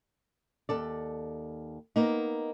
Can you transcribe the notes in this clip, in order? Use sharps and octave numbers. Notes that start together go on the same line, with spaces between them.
D#2 A4 D5
A#3 B3 D#4